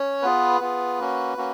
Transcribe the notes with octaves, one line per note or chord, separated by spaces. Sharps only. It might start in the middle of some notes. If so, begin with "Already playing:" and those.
Already playing: C#4 C#5
B3 F4 G#4 B4
B3 F4 G#4
A#3 C#4 F#4
A#3 C#4 F#4